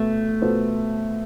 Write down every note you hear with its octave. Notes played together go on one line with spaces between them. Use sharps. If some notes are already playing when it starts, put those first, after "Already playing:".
Already playing: B2 A3 B3
B2 B3 F4 A4 C5